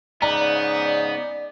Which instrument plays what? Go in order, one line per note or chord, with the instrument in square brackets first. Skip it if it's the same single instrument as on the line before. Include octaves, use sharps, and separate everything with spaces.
[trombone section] G#2 C#3 D#4 [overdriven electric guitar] B3 [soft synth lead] D5 [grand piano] A#5